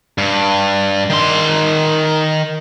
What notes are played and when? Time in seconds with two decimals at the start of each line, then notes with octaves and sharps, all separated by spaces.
0.18 G2
1.10 D#3 C6